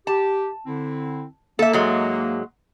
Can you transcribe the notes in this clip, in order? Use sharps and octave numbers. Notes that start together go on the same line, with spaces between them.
G4 A5
D3 C4 E4
A#3 A4 E5
G#2 F#3 G#3